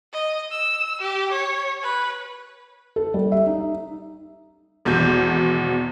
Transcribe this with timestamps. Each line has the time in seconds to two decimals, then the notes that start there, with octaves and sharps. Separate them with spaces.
0.13 D#5
0.51 E6
1.01 G4
1.32 C#5
1.83 B4
2.96 A4
3.14 G3
3.32 E5
3.46 D#4
4.85 G#1 E2 B2 G6